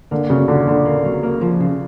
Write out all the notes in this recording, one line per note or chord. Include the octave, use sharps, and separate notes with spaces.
D3 A#3
C#3 F#3
A#2 D3
A#2 D3
A#3
F#3
A#3
F3
C#3